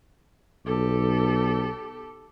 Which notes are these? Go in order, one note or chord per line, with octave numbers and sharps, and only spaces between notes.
B1 G4 A4